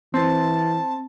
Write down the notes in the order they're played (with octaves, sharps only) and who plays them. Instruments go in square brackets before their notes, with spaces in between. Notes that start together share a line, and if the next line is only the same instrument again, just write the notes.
[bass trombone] E3 [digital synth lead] C4 [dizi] A5